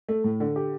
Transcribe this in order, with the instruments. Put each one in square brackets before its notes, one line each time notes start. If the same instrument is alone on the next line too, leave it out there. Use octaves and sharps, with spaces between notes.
[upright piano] A3
A2
D3
G4